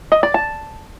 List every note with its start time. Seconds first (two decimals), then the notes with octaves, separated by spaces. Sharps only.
0.12 D#5
0.23 D5
0.34 A5